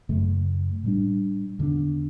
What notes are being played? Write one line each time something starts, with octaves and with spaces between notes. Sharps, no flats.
F#2 C#3 F#3 A3
A2 G3 D4
E2 D3 A3 D4